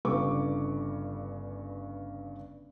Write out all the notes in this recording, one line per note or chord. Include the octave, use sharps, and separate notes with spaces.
G1 G2 C#3 B4 C#6 D6